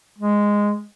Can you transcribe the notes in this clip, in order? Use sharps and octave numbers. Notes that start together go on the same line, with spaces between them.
G#3